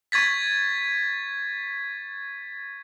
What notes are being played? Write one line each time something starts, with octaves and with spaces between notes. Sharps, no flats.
C#6 G#6 A6 B6